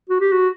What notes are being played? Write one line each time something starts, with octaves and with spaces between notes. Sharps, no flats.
F#4
G4
F#4